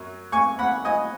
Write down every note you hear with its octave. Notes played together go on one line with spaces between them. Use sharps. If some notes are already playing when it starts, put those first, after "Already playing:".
Already playing: F#2 F#3
G#5 C#6
F#5 B5
D#5 G#5